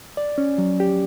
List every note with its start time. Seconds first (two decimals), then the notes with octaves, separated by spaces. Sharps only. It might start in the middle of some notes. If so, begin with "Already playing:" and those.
0.17 D5
0.38 C#4
0.58 F#3
0.80 G4